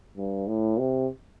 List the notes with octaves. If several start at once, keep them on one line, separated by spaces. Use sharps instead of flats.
G2
A2
C3